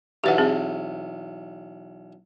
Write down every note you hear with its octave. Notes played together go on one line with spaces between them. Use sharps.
B1 E2 G4 B4 F#5
C4 G#4